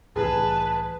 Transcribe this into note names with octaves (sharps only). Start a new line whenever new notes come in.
C2 A2 E3 G#4 B4 A5